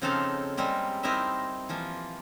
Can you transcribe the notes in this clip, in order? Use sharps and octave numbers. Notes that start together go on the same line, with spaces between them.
C#3 F3 C4 D#4 A4 F5
G3 G#3 A#3 C4 G4
C4 D#4 E4 A#4 D#5 E5
E3 F3 A#3